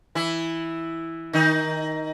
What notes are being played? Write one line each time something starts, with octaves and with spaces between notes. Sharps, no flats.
E3 E4
D#3 D#4